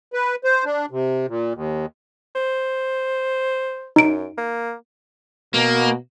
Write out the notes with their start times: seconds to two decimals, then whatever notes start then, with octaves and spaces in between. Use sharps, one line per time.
0.13 B4
0.44 C5
0.65 D4
0.91 C3
1.28 A#2
1.54 D#2
2.35 C5
3.96 F#2 D#4 D7
4.38 A#3
5.54 B2 A#3